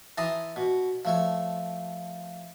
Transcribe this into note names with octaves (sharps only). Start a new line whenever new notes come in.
E3 A5 A#5 C6 D#6
B2
F3 A3 C#5